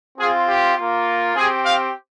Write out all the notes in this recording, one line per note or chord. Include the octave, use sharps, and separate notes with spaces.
C4 F4 G#4
G4
A#3 F4
C4 G4 G#4
F5